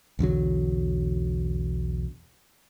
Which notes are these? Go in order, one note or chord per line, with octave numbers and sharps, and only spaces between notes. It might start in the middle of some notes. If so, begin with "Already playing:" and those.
B1 E2 D3 F#3